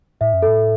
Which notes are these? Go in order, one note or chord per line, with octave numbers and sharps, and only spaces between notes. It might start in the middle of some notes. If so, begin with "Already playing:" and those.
A2 E5
F#2
A2 A4